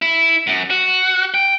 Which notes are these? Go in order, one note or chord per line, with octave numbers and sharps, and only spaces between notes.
E4
F#2
F#4
G5